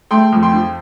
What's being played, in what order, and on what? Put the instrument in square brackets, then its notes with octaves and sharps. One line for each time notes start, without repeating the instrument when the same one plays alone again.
[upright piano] A3 G5 C6
F2
G5 C6
F3